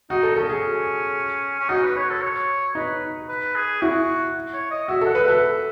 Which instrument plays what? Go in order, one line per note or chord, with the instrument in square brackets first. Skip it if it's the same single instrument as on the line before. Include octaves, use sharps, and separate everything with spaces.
[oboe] D#4 [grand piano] F#4
[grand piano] A4
[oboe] C#4 [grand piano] A4
[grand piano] G#4
[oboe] C#4
[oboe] D#4 [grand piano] F#4
[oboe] B4
C#5
A4
C#5
[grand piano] D#4 [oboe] B4
[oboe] B4
G#4
[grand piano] E4 [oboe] F#4
[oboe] C#5
D#5
[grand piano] F#4 [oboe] E5
[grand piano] A4
[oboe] F#5
[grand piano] B4
[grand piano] A4 [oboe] E5